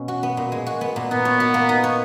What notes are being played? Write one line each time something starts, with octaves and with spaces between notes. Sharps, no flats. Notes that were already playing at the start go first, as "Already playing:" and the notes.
Already playing: B2 C#4
F#4
B3
A#2
G#3
F#4
B3
A#2
B3 D#4
C#5
F#4
A#3
D#4
C#5